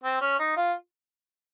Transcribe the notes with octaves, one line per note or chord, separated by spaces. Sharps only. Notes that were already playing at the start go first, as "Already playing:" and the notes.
C4
C#4
D#4
F4